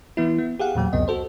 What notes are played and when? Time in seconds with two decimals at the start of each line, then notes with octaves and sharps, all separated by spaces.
0.17 E3 B3 E4
0.38 B3
0.59 G4 G#4 F5 F#5
0.75 E2 A#2 F#3 G5
0.93 C#2 F#2 C3 B3 D#5
1.08 F#4 A4 C5